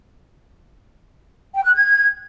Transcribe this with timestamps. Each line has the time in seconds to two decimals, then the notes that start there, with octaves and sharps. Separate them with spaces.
1.55 G5
1.65 F#6
1.75 G#6